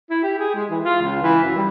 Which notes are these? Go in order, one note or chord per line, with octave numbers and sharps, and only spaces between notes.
E4
G4
G#4
G#3
E3
F4
C#2
E3
F#2
G3